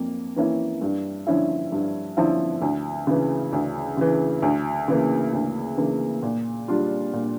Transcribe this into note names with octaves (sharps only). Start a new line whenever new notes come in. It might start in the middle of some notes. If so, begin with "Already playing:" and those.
Already playing: F2 A#3
E3 A#3 C#4 E4
G2
D3 F3 C#4 E4
G2
D3 F3 C#4 E4
D2
C#3 E3
D2
C#3 E3
D2
C#3 E3 A#3
D2
C#3 E3 A#3
A#2
G3 D4 F4
A#2